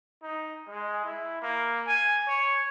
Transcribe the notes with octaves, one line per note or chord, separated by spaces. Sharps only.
D#4
G#3
E4
A#3
G#5
C#5